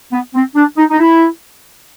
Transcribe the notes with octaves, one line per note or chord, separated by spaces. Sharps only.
B3
C4
D4
D#4
D#4
E4